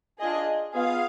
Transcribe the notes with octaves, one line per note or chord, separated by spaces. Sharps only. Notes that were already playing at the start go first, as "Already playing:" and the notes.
D4 F4 G#4 D#5
B3 F4 G#4 F5